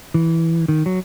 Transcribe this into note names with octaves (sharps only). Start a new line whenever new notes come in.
E3
D#3
F#3